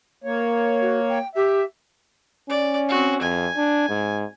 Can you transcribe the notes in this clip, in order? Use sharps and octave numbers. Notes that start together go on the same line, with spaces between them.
A#3 C#5
F#4
G5
G4 E5
C#4 D5
C4 F#4
F2 G#5
D4
G#2